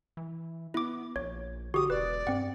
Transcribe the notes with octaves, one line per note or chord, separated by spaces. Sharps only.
E3
B3 E4 D6
A#1 C#5
D3 F#4 G4 D#6
E1 B4 D5
G2 C4 F#5